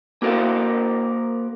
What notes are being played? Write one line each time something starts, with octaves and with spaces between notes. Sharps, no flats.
A#3 F#4 A#4 C5 F5